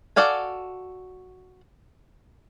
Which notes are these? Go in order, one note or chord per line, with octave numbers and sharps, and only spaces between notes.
F#4 A4 D5 F5 G#5